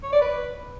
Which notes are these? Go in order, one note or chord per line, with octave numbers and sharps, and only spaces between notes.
C#5
D5
B4